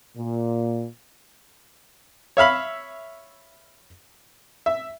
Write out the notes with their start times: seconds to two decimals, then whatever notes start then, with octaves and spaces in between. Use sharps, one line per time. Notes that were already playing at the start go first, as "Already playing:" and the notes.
0.17 A#2
2.37 C#5 E5 F5 B5
4.66 E5